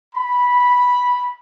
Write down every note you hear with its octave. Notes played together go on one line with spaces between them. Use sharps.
B5